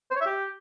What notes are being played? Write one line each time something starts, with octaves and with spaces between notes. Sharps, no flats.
C5
C#5
E5
G4